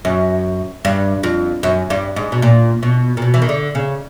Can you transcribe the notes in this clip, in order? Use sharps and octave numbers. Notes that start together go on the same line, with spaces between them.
F#2
G2
F2
F#2
G2
G#2
B2
A#2
B2
A#2
B2
E3
D#3
D3
C#3